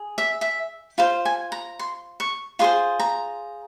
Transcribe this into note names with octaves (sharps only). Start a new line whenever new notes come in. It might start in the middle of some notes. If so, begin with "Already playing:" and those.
Already playing: G#4
E5
E5
F4 C5 F5
G#5
A#5
C6
C#6
F4 G#4 C5 C6
A#5